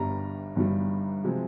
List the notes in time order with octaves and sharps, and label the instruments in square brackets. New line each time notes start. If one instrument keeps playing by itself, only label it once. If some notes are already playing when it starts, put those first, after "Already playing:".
Already playing: [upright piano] G1 G2 G3 A#5
G1 G2 G3
C3 F3 G#3